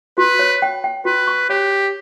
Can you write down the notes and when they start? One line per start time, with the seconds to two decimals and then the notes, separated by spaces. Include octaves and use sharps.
0.18 F#4 B4
0.39 C#5
0.62 G5
0.84 G5
1.05 F#4 B4
1.27 C#6
1.49 G4 C#5